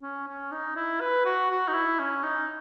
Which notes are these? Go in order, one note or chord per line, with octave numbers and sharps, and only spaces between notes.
C#4
C#4
D#4
E4
B4
F#4
F#4
D#4
E4
C#4
D#4